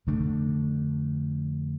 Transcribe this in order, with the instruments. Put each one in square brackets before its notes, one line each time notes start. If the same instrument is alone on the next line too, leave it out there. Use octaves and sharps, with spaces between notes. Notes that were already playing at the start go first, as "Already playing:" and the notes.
[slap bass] F2 D3 A3 D4